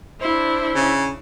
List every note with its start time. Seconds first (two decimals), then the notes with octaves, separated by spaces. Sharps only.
0.21 D4 E4 C5
0.75 C#3